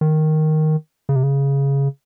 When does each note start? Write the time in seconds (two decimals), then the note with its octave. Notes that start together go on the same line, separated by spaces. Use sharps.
0.01 D#3
1.09 C#3
1.16 C3
1.23 C#3